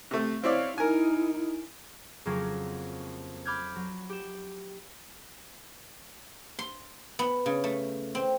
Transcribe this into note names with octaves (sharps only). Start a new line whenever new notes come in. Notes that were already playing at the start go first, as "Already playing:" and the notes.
C3 A3
C4 E4 C#5 D5 F5
D#4 E4 A#4 G#5
F2 C#3 F#3 A#3 C4 C#4
B5 D6 F6 G6 G#6
F#3
G4 E7
C6
B3
C#3
A3
C4